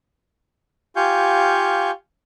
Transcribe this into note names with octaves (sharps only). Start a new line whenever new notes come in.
F4 G4 F5 G#5 C#6 G6